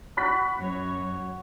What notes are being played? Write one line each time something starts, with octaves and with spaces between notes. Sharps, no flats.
F#4 B5 F#6 B6
F#2 C#5